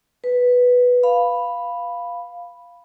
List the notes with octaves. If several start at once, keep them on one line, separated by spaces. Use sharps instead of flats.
B4
F5 B5